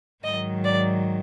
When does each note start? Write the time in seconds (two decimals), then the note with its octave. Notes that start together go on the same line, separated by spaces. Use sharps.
0.24 G#2 D#3 F#3 D#5
0.64 D5